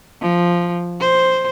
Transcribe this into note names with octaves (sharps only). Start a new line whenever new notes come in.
F3
C5